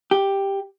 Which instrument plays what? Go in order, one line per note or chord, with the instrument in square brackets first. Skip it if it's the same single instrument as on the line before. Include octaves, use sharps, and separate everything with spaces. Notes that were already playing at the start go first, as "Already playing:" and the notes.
[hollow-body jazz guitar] G4